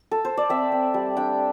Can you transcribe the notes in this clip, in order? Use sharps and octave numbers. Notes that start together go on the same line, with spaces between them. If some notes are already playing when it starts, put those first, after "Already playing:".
Already playing: G4
A4
C5
D5
C4 E5
C4
G3
D4 G5